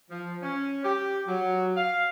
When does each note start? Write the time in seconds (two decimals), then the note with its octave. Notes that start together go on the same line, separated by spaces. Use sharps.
0.10 F3
0.43 C#4
0.84 G4
1.28 F#3
1.76 F5